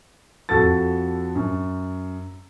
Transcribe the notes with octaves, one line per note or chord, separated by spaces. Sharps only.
F2 F#4 A4 A6
F#2